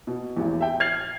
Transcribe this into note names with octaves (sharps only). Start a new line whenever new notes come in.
B2
A1 E2
E5 G5
F6 G#6 A6 C7 F7 F#7